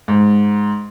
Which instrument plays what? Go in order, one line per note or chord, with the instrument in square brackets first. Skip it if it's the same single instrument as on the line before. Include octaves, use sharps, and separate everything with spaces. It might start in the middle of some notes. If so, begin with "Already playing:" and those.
[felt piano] G#2